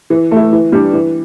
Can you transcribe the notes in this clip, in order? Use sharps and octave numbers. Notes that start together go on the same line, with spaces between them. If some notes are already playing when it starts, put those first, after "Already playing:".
E3
A3
E4
E3
G3 D4
E3